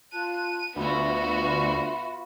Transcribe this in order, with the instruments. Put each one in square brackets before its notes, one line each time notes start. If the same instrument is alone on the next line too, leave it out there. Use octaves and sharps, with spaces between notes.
[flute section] F4 A5 F#6 [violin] D#7
[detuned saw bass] D2 [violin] B3 F#4 [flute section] F4 E5 B5